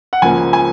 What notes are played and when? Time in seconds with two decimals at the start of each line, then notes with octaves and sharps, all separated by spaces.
0.13 F#5
0.22 C#2 C#3 F3 A#3 G#5
0.53 G#5